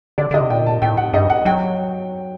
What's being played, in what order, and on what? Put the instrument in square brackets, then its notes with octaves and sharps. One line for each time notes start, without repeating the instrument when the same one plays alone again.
[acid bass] D3 [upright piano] D5
[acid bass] D3 [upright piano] D#5
[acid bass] C3
[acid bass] A#2 [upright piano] G5
[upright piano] A5
[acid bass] A2 [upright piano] G5
[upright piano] F#5
[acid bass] G2 [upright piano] D#5
[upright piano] F#5
[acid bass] F#3 [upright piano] G5